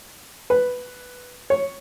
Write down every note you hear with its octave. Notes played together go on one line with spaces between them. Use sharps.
B4
C#5